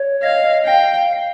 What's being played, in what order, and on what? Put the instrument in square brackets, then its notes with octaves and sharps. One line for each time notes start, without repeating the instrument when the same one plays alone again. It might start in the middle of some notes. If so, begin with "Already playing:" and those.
Already playing: [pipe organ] C#5
[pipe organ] D#5 [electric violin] F5
[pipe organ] F5 [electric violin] G5